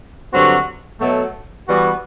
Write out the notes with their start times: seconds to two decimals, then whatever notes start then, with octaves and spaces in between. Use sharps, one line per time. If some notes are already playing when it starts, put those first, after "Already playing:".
0.32 G2 D3 F#3 C4 F#4
1.00 B2 F#3 A3
1.67 E3 G3 B3 F#4